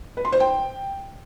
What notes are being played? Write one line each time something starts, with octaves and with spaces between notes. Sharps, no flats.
B4
C6
C5
G5